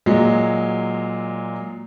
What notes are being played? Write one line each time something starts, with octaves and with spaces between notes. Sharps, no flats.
A#2 F#3 G#3